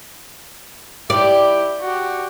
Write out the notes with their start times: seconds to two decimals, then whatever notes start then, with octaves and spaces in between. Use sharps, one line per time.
1.10 E4 G4 D5
1.81 F#4 G4